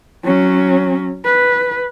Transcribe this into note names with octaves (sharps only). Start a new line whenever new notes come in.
F#3 C#4
B4